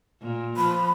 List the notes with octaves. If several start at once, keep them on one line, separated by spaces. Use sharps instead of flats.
A#2
F3 B5